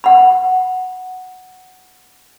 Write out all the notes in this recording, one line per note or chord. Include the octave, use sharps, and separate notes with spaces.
F#5 B5